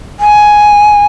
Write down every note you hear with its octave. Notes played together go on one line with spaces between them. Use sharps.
G#5